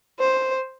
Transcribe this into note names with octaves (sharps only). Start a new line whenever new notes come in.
C5